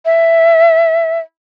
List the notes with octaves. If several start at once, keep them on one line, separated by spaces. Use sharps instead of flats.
E5